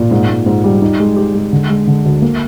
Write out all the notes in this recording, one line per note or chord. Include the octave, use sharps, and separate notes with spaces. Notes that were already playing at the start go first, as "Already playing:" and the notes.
Already playing: A#2
G#2
G#2
G#2
G3
D#4
G#3
G4
G#3
D3
G#3
D3
D2
A#3